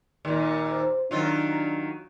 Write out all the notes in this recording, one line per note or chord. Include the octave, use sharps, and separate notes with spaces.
D#2 A#2
C5
D#3 F#3 D4 F4